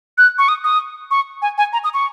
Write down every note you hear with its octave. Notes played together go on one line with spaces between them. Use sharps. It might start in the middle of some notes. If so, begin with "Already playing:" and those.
F#6
C#6
D#6
D#6
C#6
G#5
G#5
A#5
D#6
C#6